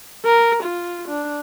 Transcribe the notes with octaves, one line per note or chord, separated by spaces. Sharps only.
A#4
F4
D4